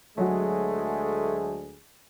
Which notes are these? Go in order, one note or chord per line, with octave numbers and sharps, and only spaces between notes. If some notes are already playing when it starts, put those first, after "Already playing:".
D2 F#3 G#3 A3 F#4 G#4